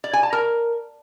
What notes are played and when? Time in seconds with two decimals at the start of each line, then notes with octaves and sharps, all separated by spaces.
0.04 D5
0.13 G#5
0.23 A5
0.33 A#4